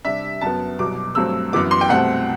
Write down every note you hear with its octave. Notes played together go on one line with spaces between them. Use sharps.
C3 G3 D4 E5
F#2 F#3 B3 A5
C2 B2 F#3 D6
G2 F#3 A3 C4 E6
F#2 E3 B3 D6
C6
G5
C2 B2 A3 C4 F#5